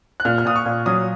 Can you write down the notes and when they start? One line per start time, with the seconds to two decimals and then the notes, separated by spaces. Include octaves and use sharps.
0.20 F#6
0.25 A#2 F6
0.38 F6
0.45 A#2 D#6
0.56 C#6
0.66 A#2
0.86 F#3 D#6